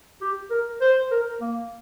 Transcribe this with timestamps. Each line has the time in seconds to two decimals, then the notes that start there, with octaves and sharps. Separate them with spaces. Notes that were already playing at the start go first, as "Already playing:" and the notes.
0.21 G4
0.50 A#4
0.81 C5
1.11 A#4
1.41 A#3